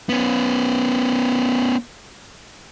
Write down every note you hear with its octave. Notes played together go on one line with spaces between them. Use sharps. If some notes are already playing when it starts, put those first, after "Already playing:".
B3 C#4